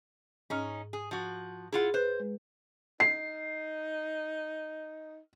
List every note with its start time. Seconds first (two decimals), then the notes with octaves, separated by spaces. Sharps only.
0.50 G#2 C#4 D#4 F6
0.93 G#4
1.11 F3 F#4
1.73 E4 F4 G#4 F#5
1.94 B4 C5 F#6
2.20 G#3
3.00 D#4 C7